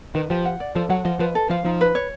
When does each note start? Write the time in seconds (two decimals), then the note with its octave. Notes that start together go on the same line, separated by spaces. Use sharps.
0.15 D#3 B4
0.30 F3 G4
0.46 F#5
0.60 D5
0.76 F3 A4
0.90 F#3 F#5
1.05 F3 D#5
1.19 F3 B4
1.35 A4
1.50 F3 F5
1.65 F3 D#4
1.81 B4
1.95 C#5